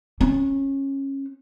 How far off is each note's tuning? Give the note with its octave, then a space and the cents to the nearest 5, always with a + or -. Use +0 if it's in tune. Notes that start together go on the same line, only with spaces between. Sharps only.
C#4 -20